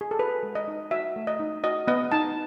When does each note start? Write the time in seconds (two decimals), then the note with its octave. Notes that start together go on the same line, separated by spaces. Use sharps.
0.01 G#4
0.11 A4
0.19 F#4 B4
0.43 G#3
0.55 D#5
0.68 D#4
0.91 F#4 E5
1.16 A3
1.27 D#5
1.40 D#4
1.64 F#4 D#5
1.87 B3 D#5
2.12 D#4 A5